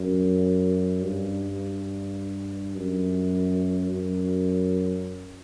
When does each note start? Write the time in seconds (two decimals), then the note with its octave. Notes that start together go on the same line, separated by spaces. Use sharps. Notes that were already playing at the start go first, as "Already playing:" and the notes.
Already playing: F#2
1.02 G2
2.76 F#2
3.91 F#2